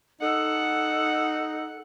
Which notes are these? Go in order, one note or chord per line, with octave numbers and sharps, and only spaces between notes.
D#4 A4 F#5